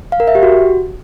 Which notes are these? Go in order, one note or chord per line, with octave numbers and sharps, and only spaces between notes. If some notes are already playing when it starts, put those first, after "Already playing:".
F5
A#4
E5
G4
F#4